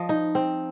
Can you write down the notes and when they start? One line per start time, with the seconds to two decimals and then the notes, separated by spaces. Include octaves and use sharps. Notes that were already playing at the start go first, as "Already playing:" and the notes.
Already playing: F3 D#5
0.09 D#4
0.35 C4